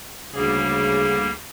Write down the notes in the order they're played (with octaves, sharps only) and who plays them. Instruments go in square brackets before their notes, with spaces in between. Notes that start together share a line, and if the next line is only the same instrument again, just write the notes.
[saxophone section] D2 G#4 [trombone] C#3 [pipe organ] G3 A#3